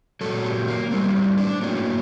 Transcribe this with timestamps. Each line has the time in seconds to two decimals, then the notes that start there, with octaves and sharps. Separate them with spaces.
0.21 A#2 F#3 A4
0.44 G4
0.68 A#3
0.91 A2 G3 C4
1.15 C4
1.38 D4
1.61 A2 F#3 A#3